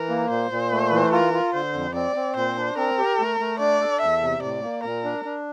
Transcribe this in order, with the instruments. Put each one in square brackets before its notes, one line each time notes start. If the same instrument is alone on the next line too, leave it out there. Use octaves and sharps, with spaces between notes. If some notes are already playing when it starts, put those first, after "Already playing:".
Already playing: [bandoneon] E3 [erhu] A#4
[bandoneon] A#3
[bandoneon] A#2 [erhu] C5
[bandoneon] A#2
A3
E3
[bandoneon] F4 [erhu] A#4
[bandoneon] F4
[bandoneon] D3 [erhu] C5
[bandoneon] F2
[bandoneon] C4 [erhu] D5
[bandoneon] C4
[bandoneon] A#2 [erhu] C5
[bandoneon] D4
[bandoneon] C4 [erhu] A#4
[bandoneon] G4
A3
A3
[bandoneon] D4 [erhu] D5
[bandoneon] A4
[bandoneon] E2 [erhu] E5
[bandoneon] C3
[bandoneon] A2 [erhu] D5
[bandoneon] A#3
[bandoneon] A#2 [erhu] A#4
[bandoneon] D4
D4